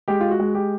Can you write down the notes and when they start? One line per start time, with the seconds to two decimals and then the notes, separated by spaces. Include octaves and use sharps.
0.08 G#3 G4
0.21 F4
0.31 F#4
0.40 G#3
0.54 G4